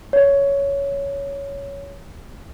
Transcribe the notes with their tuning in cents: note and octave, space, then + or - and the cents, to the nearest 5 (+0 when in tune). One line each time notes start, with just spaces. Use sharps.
C#5 +10